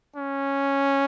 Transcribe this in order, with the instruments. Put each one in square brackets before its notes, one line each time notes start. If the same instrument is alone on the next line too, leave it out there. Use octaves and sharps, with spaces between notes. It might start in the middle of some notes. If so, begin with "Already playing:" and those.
[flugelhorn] C#4